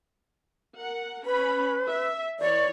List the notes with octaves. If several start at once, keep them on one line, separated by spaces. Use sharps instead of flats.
A#4 F#5
C#4 B4 B5
E5
E3 C#5 D5